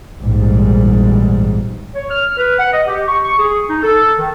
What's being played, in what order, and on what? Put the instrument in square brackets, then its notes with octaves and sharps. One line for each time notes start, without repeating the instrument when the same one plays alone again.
[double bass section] A#1 E2 G#2 G3
[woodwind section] C#5
F6
B4
F#5
D#5
G4
C#6
C#6
G#4
D#4
A4
D#3